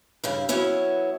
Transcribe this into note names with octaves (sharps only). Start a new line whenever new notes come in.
G2 C#3 E4
F#3 B3 C#4 E4 E5